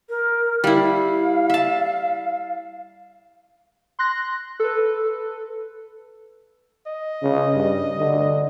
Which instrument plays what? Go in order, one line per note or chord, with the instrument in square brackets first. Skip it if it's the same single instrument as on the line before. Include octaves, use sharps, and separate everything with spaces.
[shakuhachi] A#4
[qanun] G3 E4 [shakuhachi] F5
[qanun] E5 A5
[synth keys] C6 F#6 A#6
A4 B4
[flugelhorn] D#5
[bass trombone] C#3
G2
D3